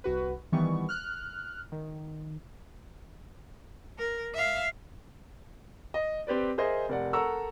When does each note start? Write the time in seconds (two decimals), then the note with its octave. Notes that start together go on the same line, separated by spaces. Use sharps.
0.04 C2 F#4 B4
0.52 D#3 E3 G3 B3 C#6
0.89 F6 F#6
1.72 D#3
3.99 A#4
4.34 E5 F5
5.94 D#5
6.27 C4 G4 B4 D5
6.58 G#4 A#4 C5 D#5 E5
6.89 F1 A#4 D5 F#5
7.13 A4 A#4 F#5 A#5 C#6 E6